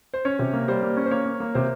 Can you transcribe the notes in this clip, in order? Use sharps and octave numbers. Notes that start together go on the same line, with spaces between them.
C5
C#4 C#5
C3
A#3
G3 C5
A#3
C#4
C5
A#3 C#5
A#3
A#3
C3 C5